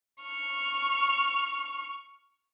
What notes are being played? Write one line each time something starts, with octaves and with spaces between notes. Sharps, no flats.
C#6 F6